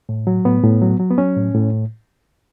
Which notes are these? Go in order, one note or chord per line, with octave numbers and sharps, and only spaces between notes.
A2
F#3
A2 B3
A2
F#3
F#3
B3
F#3 C#4
A2
A2